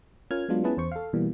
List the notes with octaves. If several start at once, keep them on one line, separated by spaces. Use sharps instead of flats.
C#4 F4 A#4 F6 G#6
F#3 G#3 B3 D4 F4
B3 C#4 E4 G#4 B4 A5
E2 C5 C#6
A4 F5
B2 E3 G3 A#3